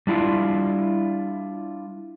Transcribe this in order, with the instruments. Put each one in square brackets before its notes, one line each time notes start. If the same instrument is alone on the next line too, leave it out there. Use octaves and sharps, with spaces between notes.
[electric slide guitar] G3 D4 E4 F4